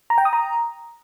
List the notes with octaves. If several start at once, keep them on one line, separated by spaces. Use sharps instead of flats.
A#5
G5
D#6
A#5